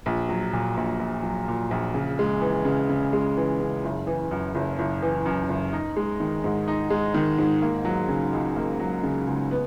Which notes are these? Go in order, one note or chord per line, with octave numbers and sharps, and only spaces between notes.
A#1
F#3
A#2
A#1
A#1
F#3
A#2
A#1
C#3
G#3
E3
C#3
C#3
G#3
E3
C#3
F#1
E3
F#2
F#1
F#1
E3
F#2
F#1
D#4
G#3
D#3
G#2
D#4
G#3
D#3
G#2
A#3
F#3
C#3
C#2
A#3
F#3
C#3
C#2
B3